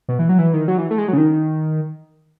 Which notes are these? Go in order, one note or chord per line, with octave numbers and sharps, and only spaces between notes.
B2
E3
F#3
E3
D#3
F#3
E3
A3
G#3
F#3
C#3
D#3